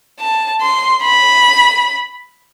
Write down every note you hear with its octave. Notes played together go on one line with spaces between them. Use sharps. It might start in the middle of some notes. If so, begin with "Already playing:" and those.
A5
C6
B5